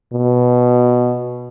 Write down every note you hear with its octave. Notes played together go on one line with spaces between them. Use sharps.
B2